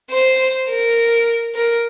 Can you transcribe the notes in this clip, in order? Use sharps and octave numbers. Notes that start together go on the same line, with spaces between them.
C5
A#4
A#4